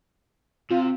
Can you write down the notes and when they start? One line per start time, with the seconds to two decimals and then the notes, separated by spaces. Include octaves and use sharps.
0.70 C3 F4